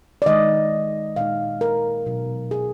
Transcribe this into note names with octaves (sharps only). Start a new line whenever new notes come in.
D5
D#3 G#3 D#4 D#5
A#2 G#3 D#4 F5
A#4
B2 F#3 B3 D#4
G#4